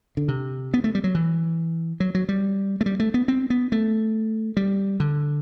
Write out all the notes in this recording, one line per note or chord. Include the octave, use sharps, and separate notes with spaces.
D3
C3
B3
A3
G3
F#3
E3
F#3
F#3
G3
A3
G3
A3
B3
C4
B3
A3
G3
D3